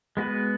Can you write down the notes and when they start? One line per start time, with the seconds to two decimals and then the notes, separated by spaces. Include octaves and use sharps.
0.17 G#3 B3 F#4 B4